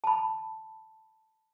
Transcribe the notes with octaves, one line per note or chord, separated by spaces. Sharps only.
A5 B5